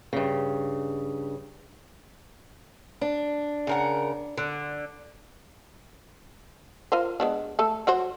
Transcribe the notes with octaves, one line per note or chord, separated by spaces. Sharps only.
G2 C#3
D4
C#3 A#4 F#5
D3
F4 A#4 C5
G#3 B3 D4
A3 A4
F#3 F#4 C5